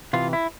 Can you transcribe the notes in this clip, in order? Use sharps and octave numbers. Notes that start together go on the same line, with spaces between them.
C3 E3 F4
E4